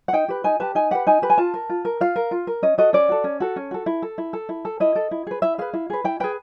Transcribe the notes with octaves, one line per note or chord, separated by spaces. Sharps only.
F#5
D#4 G5
G4 B4
D#4 G#5
G4 B4 A5
D#4 G#5
G4 B4 F#5
D#4 G#5
G4 B4
G#5
F4 A5
A#4
F4
A#4
F4 F5
A#4
F4
A#4
C#4 D#5
F#4 A4 D#5
C#4 D5
F#4 A4
C#4
F#4 A4
C#4
F#4 A4
E4
A4
E4
A4
E4
A4
E4 D#5
A4
E4
G#4 B4
E4 E5
G#4 B4 F5
E4
G#4 B4
E4 G5
G#4 B4 G5